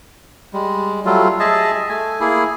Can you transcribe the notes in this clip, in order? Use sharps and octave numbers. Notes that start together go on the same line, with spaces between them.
G3 G#3
F#3 G3 A3 F4
G#4 D#5 E5 A5
A3 G#5
A#3 E4 G#4